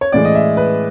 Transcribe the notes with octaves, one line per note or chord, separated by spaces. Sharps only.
C#5
A2 E3 G#3 D5
D#5
E5
B4